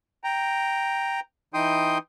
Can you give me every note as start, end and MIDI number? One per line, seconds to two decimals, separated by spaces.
0.24 1.20 79
0.24 1.20 82
1.54 1.98 52
1.54 1.98 63
1.54 1.98 79
1.54 1.98 84
1.54 1.98 87
1.54 1.98 91